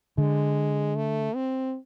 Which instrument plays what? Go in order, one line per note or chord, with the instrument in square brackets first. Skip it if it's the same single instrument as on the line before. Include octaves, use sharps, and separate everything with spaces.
[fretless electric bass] D3 [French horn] G#3
[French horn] A3
C4